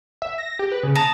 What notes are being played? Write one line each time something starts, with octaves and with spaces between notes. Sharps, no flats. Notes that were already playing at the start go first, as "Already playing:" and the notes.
E5
A#6
G4
B4
C#3
A5 A#5 D#6